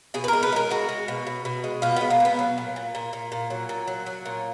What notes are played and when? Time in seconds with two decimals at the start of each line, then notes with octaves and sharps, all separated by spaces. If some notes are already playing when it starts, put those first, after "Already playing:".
0.14 B2 G#4
0.24 B4
0.28 G#3 A#4
0.43 B4
0.52 G#3 A#4
0.70 G#3 F#4
0.89 G#3
1.08 B2
1.27 B2
1.45 B2
1.64 G#3
1.82 B2 F4
1.96 G#3 B3
2.10 A#3
2.20 B2 B3
2.39 F#3
2.58 A#2
2.76 A#2
2.95 A#2
3.13 A#2
3.32 A#2
3.50 F#3
3.69 A#2
3.88 F#3
4.06 F#3
4.26 A#2